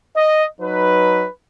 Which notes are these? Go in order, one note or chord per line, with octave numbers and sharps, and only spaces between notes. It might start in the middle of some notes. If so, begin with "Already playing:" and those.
D#5
F#3 D#4 B4